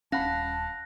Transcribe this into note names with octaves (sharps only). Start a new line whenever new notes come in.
D#1 C#4 F5 F#5 A5 B5 F#6 A#6